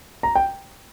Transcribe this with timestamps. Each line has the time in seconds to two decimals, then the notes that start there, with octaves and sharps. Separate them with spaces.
0.23 A#5
0.35 G5